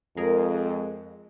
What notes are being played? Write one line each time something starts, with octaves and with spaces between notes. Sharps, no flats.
F2 G#3 G#4 A#4